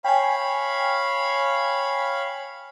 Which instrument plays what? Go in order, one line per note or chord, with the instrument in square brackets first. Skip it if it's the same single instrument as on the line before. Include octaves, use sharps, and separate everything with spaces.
[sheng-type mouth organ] C#5 F5 B5 [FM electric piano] G5 G#5